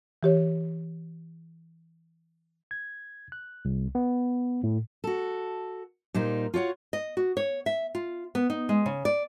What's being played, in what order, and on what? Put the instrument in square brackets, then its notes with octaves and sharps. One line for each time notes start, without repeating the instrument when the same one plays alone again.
[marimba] E3 G4 C#5
[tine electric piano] G#6
F#6
C2
B3
A2
[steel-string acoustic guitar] F#4 A4
A#2 G3 D#4 C5
F4 F#4 C#5 F#5
[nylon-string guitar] D#5
F#4
C#5
E5
F4
B3
D#4
G#3
C#3
D5